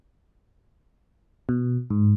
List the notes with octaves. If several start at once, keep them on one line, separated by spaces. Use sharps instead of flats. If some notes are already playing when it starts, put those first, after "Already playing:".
B2
G#2